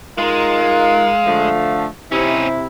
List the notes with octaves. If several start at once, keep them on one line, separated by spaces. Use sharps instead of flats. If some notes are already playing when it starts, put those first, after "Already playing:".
G#3 D#4 F4 A#4 F5
D3 F3 A3
C3 C#4 D#4 E4 C5